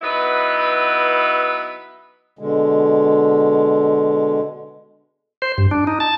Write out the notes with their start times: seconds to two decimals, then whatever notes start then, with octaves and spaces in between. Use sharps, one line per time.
0.02 F#3 B3 D#4 E4 B4
2.39 B2 D3 G#3
5.42 C5
5.58 G2
5.71 D4
5.87 D#4
6.00 A5